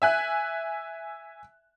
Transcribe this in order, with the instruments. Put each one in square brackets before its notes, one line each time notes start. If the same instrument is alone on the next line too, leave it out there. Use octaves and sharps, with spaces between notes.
[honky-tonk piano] E5 G#5 F#6